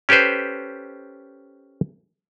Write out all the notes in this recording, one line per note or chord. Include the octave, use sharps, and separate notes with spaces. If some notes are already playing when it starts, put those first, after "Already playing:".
C#4 G4 A4 B4 C5